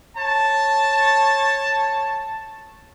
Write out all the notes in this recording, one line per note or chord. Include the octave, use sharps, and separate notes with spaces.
C#5 A5